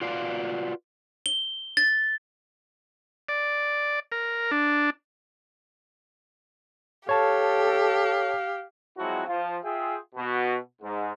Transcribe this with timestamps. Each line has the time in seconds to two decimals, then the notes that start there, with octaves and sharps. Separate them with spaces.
0.01 F4 F#4 B4 D5 F5
1.26 G7
1.77 A6
3.29 D5
4.12 A#4
4.51 D4
7.09 G4 A4 C#5 F5 A5
8.98 F3 F#3 G#3 C4 E4 F#4
9.27 F3 F4
9.63 F4 G#4 E5 G5
10.15 B2 F#4
10.82 G#2